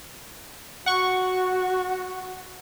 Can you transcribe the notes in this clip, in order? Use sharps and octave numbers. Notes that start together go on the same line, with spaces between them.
F#4 F#5 C#6